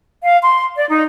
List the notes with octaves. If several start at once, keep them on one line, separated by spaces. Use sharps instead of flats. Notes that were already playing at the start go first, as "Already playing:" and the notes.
F5
C6
D5
D#4